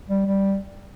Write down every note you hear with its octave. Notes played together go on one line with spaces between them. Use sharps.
G3
G3